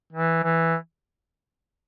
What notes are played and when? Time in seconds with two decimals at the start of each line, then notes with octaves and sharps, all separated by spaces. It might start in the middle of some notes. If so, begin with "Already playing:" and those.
0.13 E3
0.44 E3